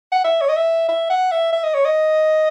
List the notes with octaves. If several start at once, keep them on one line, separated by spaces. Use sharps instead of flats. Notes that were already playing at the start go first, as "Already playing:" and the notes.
F#5
E5
C#5
D#5
E5
E5
F#5
E5
E5
D#5
C#5
D#5